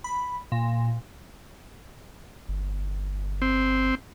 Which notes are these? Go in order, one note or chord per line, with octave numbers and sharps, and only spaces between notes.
B5
A#2
G1
C4